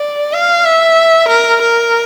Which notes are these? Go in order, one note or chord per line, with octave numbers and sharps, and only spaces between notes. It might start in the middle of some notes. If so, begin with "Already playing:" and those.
Already playing: D5
F5
E5
A#4
A#4